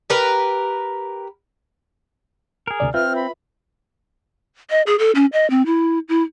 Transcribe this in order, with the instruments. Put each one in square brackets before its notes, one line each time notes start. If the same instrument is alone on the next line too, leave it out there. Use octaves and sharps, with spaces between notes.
[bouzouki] G4 A#4 B4
[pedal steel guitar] G#4 A#4
[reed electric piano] D2 C3 D5
[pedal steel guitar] C4 [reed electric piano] F4 B4 E5 [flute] F6
[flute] B5
[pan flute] D#5
G#4
A4
C#4
D#5
C4
E4
E4